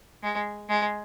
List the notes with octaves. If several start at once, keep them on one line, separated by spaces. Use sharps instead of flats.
G#3
G#3